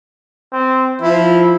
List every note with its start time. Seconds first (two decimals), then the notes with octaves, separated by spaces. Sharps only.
0.53 C4
1.02 F3 E4